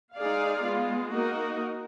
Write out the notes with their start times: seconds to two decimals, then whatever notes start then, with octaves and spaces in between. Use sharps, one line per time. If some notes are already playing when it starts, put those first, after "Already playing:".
0.17 G#3 D#4 G#4 D5 F5
0.65 G#3 B3 F4
1.12 A#3 D#4 F#4 A#4